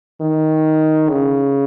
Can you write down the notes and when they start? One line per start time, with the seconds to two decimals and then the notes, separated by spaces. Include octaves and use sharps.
0.21 D#3
1.10 C#3